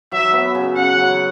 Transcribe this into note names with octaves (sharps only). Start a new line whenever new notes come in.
F#3 E5
B3
C#3
C#3 F#5
F#3